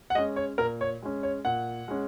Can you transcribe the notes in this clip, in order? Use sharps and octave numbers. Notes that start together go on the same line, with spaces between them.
F#5
G#3 C#4 D#5
C#5
A#2 A#4
C#5
G#3 C#4
C#5
A#2 F#5
G#3 C#4